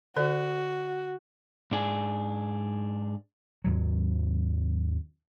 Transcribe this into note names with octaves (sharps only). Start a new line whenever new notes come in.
D3 F#4 A4 D5
G#2 D4 G#4
D#2 G#2 F#3